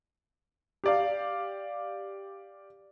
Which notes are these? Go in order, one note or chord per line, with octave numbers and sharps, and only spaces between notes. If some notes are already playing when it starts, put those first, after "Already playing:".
G4 D5 F5